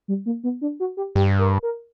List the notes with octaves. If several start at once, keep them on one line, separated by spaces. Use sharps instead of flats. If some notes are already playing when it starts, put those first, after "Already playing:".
G3
A#3
B3
D4
F#4
G4
G2 G4
A#4
A#4